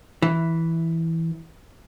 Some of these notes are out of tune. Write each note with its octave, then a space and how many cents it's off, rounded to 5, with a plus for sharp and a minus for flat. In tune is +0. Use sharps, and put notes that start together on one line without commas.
E3 -5